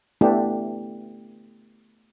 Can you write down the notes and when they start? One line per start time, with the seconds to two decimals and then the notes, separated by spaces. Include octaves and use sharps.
0.21 A3 B3 D4 E4 G4